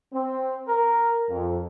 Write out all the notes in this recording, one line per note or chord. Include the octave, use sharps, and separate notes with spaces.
C4
A#4
F2